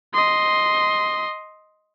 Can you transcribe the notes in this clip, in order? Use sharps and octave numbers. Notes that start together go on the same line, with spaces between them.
D#5 C6